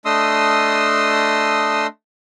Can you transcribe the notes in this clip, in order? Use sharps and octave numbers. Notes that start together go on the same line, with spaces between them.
A3 D4 D#5 C6 D#6 E6